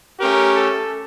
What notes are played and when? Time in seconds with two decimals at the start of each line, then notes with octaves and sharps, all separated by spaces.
0.20 A3 C#4 G4 A#4
0.55 A4